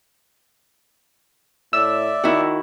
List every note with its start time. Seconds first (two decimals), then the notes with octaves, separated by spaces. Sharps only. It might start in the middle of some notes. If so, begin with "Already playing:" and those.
1.73 A2 D5 E5 E6
2.24 D#3 E4 F#4